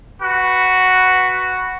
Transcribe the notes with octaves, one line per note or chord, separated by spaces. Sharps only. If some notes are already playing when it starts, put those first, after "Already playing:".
F#4 B4